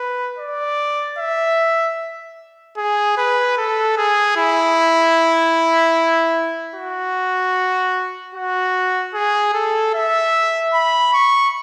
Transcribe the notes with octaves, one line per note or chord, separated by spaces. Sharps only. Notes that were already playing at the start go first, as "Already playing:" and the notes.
Already playing: B4
D5
E5
G#4
B4
A4
G#4
E4
F#4
F#4
G#4
A4
E5
B5
C#6